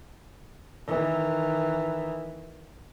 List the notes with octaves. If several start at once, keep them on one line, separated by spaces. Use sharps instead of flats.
D#3 E3